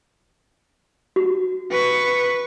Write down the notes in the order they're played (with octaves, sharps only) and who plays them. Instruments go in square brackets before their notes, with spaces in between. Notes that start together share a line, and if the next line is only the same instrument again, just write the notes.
[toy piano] F#4
[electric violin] B4 C#6